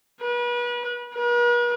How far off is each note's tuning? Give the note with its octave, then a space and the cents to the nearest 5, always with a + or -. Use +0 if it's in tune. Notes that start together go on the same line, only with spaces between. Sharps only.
B4 -35
B4 -45